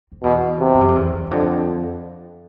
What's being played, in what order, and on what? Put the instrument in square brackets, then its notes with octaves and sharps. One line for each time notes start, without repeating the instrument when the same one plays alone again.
[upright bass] F2
[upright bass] E2 [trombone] B2
[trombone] C3
[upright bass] G2
F#2
F2
E2
E2
E2
[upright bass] F2 [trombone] D3